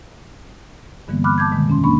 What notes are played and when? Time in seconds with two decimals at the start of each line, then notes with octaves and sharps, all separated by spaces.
1.08 G2 D3 E3 G3 A#3 B3
1.24 B5 D6 F6 F#6
1.38 A5 D6 G6 G#6
1.51 B2 D3 D#3 G#3
1.68 F2 C#4 C6
1.84 D2 A#3 D4 B5 C#6